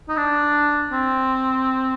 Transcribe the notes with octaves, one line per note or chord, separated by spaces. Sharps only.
D#4
D4
C4